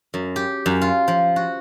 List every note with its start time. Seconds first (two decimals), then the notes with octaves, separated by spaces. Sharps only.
0.14 F#2
0.36 G4
0.66 F#2
0.82 F4
1.08 F3
1.36 F#4